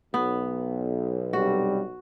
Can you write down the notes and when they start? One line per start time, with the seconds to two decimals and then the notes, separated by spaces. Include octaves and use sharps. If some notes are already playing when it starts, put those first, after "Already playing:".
0.14 B1 B3
1.33 G2 C3 G3 F#4